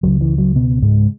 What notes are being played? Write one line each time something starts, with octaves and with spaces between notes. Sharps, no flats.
C#2 C#3 F#3
E3
F#3
B2 B3
G#2 G#3